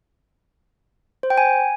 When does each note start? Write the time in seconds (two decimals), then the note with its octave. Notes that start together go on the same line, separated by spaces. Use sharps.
1.23 C5
1.30 G5
1.38 G#5